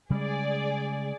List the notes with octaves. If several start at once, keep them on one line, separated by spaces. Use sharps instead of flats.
C#3 G3 G#3 G#4 D5